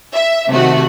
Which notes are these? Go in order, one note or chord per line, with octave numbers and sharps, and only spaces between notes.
E5
C3 D#3 A3 F#4